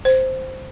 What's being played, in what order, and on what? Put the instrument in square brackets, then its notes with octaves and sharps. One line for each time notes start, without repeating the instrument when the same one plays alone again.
[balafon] C5